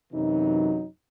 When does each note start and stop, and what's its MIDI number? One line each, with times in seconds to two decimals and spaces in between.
0.13 0.85 42
0.13 0.85 48
0.13 0.85 52
0.13 0.85 54
0.13 0.85 63